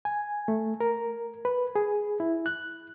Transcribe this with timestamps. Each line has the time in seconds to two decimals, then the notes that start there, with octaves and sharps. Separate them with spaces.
0.05 G#5
0.48 A3
0.80 A#4
1.45 B4
1.75 G#4
2.20 E4
2.46 F#6